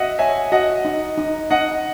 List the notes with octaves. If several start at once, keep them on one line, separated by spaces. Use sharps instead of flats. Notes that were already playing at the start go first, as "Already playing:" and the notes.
Already playing: F#4 D#5 E5 F#5
C#5 E5 G#5
F#4 D#5 F#5
D#4
D#4
D#4 D#5 F#5